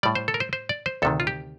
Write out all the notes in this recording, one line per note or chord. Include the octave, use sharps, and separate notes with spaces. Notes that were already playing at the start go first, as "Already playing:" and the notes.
A2 G3 D5
C5
A4
A#4
C5
C5
D5
C5
D2 C3 D#3 A4
F4
G4